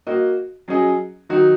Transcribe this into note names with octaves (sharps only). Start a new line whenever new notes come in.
A#3 F#4 D#5
F#3 C#4 G#4 D#5
D#3 F#3 D#4 F#4